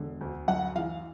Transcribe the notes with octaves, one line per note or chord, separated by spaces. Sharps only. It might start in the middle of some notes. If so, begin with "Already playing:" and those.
Already playing: E1 D3
D2
F#2 F#5
E3 F5